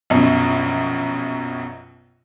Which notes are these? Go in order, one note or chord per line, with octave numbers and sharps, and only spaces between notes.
A#1 F#2 B2